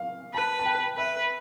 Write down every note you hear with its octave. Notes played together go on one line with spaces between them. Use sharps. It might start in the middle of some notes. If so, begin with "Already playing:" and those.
Already playing: F5
B4 A5
A5
G5
B4 E5